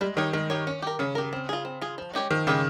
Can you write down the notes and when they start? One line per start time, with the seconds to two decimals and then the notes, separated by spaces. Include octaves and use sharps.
0.01 G3 G#3
0.17 D#3 D#4 G4 C#5
0.33 D#3 G#3
0.50 D#4 G4 C#5
0.67 C#4
0.82 G4 A#4
0.99 C#3 C#4
1.15 G4 A#4
1.33 C4
1.49 F4 G#4
1.65 C4
1.81 F4 G#4
1.98 F3
2.14 G#3 C#4 G4 C#5
2.30 D#3 F3
2.47 C#3 G#3 C#4 G4 C#5